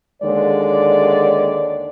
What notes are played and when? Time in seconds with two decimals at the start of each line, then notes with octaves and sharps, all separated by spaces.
0.22 D#2 D3 G#3 C#5 D5